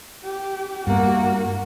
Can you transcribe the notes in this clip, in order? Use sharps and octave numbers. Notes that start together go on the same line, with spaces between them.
G4
G2 A#3 F#4